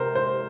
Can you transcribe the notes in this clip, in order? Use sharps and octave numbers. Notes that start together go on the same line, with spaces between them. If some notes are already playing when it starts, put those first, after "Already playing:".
Already playing: C3 A#4 C5
C5